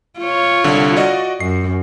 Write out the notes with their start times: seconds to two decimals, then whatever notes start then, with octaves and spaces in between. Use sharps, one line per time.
0.20 F4 C#5
0.64 C2 D3
0.97 F#4 D5 D#5
1.40 F#2 C7